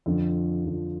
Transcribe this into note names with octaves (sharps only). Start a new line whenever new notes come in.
F2 D3 F3
F2 D3 F3